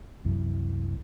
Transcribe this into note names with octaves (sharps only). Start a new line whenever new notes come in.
C2 F#2 E3